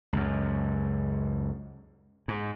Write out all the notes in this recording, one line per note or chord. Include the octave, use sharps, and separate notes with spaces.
C#2 F#2
G#2